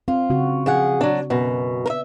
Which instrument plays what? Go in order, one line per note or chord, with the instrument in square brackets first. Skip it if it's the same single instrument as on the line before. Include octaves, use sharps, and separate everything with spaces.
[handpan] C4 [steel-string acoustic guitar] F4
[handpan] C#3 C4 F#4
[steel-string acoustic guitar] F3 G#4 F#5
F#3 D4
F#2 B2
A#4 E5